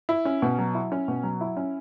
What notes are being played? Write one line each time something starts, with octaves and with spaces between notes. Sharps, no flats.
E4
C#4
B2
F#3
E4
C#4
B2
F#3
E4
C#4